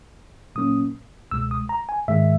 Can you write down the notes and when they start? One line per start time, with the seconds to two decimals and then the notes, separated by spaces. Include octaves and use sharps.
0.55 A#2 F#3 A#3 C#4 D#6
1.31 C#2 B2 G#3 E6
1.51 D#6
1.69 A#5
1.89 G#5
2.08 G#2 D#3 G#3 E5